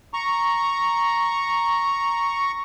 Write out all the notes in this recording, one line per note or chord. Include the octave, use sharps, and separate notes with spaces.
A#5 C#6